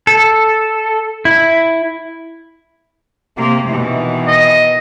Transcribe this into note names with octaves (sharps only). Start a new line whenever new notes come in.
A4
E4
C3 A#3
B2 D#3 E3
D#5